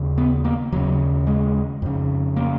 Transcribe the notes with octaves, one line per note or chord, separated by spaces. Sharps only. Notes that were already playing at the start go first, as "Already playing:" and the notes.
Already playing: D#2 C#3
B3
A#3
D#2 C#3 F#3
G#3
F2 C#3
A#3